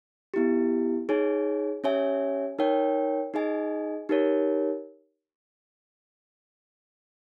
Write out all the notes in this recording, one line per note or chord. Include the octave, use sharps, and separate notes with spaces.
B3 E4 G4
D#4 G#4 C#5 G#5
C#4 G4 C#5 E5 G#5
D#4 A#4 C#5 G5
D#4 G#4 D#5 G#5
D#4 G4 A#4 C#5